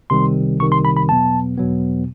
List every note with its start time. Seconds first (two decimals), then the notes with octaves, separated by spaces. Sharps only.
0.10 C2 C3 D#3 G3 C6
0.60 C2 C3 D#3 G3 C#6
0.72 C6
0.85 B5
0.97 B5
1.08 E2 B2 F#3 B3 A5
1.58 E2 B2 F#3 B3